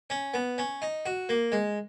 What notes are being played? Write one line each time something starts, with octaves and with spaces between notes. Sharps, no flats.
C#4
B3
C#4
D#4
F#4
A#3
G#3